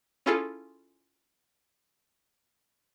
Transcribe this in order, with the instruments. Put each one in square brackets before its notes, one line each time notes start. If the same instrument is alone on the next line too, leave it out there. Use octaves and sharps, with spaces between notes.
[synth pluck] C#4 E4 F4 G#4 A4